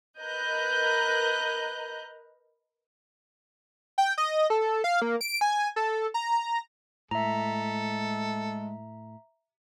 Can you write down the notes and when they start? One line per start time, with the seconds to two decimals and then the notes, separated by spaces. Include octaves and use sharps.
0.21 A#4 B4 D#5 A#5 F#6 G6
3.98 G5
4.18 D#5
4.50 A4
4.84 F5
5.02 A#3
5.21 D7
5.41 G#5
5.76 A4
6.14 A#5
7.11 A2 G#3 A4 E5 A#5